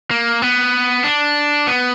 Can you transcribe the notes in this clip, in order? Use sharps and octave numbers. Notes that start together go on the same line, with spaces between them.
A#3
B3
D4
B3